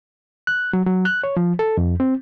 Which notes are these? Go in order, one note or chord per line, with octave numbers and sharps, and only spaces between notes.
F#6
F#3
F#3
F#6
C#5
F3
A4
F2
C4